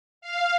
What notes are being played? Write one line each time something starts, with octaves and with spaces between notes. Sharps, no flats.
F5